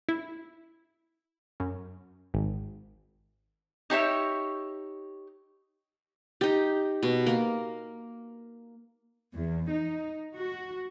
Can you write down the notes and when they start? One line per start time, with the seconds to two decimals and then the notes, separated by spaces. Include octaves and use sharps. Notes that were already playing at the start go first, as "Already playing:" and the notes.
0.09 E4
1.60 F#2
2.34 G#1
3.90 D#4 G4 C#5 E5
6.41 D#4 G4
7.03 B2
7.26 A#3
9.34 E2
9.69 D#4
10.34 F#4